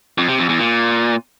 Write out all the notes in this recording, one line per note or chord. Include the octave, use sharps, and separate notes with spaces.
F2
C3
F2
E2
A#2